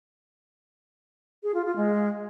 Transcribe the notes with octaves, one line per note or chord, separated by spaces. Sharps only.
G#4
F4
F4
G#3